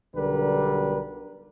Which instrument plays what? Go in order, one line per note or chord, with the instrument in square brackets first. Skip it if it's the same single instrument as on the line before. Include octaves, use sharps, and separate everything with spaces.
[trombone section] B1 D3 G3 A#4 B4